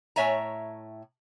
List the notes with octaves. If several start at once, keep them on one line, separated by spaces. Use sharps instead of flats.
A2 C#5 E5 G#5 A#5